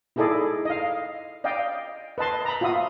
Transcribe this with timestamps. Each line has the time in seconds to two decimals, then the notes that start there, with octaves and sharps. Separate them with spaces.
0.16 D#4 E4 G#4 A4 D5 D#5
0.65 D#5 F5
1.44 D5 D#5 F5 G5
2.18 B4 D#5 A5 C6
2.45 A#5 B5
2.61 F4 F#4 E5 F5 D#6